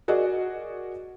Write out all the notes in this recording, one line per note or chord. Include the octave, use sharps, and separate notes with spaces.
F#4 G#4 A#4 D5 D#5